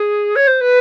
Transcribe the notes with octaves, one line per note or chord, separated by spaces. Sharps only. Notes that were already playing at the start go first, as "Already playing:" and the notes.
Already playing: G#4
C#5
C5
B4